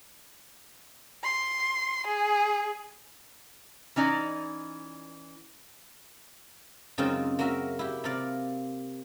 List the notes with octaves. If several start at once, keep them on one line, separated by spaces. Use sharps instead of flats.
C6
G#4
E3 C#4 D#4 D5
F#2 C#3 G#3 C4 D#4 F4
A#3 C#4 F#4 A#4 E5
E4 G4
C3 A#4 D5 F5